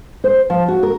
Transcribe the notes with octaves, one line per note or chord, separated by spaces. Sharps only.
C5
F3
F#4
A#4